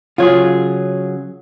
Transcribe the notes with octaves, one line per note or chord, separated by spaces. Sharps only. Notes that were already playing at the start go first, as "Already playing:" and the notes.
C#3 F#3 F4 G#4 C#5